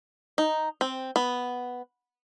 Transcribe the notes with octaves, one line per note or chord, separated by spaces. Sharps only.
D#4
C4
B3